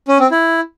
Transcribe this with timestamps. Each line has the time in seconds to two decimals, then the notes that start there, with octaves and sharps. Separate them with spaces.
0.08 C#4
0.20 C4
0.31 E4